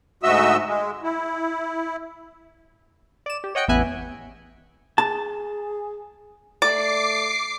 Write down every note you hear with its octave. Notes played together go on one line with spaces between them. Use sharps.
D2 G#2 F#4 D#5 E5 E6
G#3
E4
D5 E7
G4
C#5 D#5 F#5 G5 C#7
A1 E2 B3 E5 G#5 F#6
G#4 A5
A3 D5 D6 C7